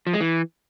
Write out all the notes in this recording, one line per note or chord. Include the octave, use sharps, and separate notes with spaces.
F3
G#3
E3